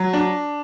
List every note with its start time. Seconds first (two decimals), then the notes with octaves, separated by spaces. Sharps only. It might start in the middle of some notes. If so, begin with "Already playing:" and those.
Already playing: F#3
0.13 D4